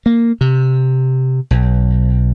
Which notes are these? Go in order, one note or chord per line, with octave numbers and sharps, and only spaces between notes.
A#3
C3
B1